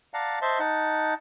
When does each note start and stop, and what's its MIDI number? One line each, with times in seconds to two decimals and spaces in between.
0.14 0.39 74
0.14 0.39 77
0.14 0.39 78
0.14 0.39 81
0.14 0.39 82
0.42 0.59 72
0.42 0.59 75
0.42 0.59 76
0.42 0.59 81
0.42 0.59 84
0.59 1.14 63
0.59 1.14 78
0.59 1.14 81